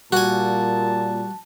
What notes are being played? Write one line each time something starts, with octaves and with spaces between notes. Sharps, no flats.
A#2 G3 F#4 G#5 A5